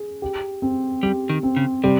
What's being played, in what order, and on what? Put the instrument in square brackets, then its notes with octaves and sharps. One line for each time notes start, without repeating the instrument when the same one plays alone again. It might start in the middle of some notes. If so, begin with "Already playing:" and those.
Already playing: [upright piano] G#4
G4
C4
[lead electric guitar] G3 [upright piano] G4
[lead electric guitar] D#3
[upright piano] C4
[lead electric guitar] C#3
[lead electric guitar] C3 [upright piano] G3